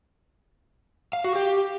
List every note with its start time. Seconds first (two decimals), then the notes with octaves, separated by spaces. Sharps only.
1.13 F5
1.24 F#4
1.36 G4